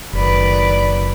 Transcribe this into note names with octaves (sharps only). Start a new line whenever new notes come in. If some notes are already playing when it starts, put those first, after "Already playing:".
F#1 D#3 B4 D5